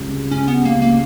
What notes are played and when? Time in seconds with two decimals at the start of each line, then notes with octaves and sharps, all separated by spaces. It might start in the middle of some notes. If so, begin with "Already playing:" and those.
Already playing: C#2 G3
0.08 C#3
0.31 C#2 C#4
0.48 B3
0.53 G3
0.65 A#3
0.76 C#2
0.82 A#3